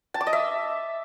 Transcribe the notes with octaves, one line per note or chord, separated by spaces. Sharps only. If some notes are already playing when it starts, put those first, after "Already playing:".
A5
D6
D#5
E5